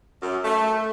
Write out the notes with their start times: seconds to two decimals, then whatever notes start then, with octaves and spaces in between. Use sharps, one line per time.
0.21 F#2
0.44 A3